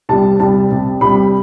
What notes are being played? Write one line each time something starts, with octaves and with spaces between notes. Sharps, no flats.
C2 C3 G3 A5
C2 C3 G3 A5
C2 C3 G3
C2 C3 G3 B5